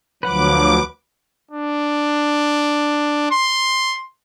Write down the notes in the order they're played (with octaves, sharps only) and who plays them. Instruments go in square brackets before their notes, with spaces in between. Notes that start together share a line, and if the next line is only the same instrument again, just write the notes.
[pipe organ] D2 F3 F#3 [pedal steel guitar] B4 F#5 [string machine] D6
[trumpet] D4
C6